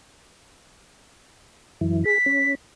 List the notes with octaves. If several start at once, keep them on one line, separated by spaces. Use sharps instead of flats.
F#2 E3
G#4 B6
C#4